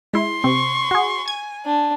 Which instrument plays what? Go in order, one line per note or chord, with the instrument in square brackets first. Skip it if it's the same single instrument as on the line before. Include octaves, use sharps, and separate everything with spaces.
[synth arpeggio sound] G#3 E4 [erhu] C6
[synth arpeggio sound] C3 C4 [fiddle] C#6
[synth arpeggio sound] F#4 G#4
[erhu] G#5 [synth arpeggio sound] G#6
[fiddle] D4